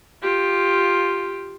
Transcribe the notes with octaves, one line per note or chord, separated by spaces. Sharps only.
F4 G4